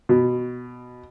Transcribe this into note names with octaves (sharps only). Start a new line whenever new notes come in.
B2